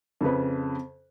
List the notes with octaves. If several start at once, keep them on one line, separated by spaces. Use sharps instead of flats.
F2 C#3 B4